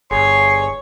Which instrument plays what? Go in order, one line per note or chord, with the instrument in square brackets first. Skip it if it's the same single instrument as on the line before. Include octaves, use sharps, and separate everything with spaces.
[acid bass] G1 [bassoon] G#4 [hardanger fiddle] C#5 [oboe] C6